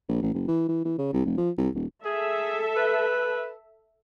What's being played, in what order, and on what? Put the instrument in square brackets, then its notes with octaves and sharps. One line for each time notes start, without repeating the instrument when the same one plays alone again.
[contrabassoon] A#1
A1
F#1
E3
E3
E3
C#3
C2
F1
F3
C2
D#1
[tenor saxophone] G#4 [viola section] A4 E5
[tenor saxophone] B4